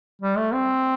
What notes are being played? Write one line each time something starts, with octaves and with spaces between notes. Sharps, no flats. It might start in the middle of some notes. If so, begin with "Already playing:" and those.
G3
A3
C4